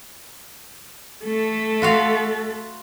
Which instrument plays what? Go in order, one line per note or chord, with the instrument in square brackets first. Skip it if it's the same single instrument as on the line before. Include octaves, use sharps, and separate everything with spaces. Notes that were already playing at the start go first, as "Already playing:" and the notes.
[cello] A3 A4
[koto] F4 F#4 F5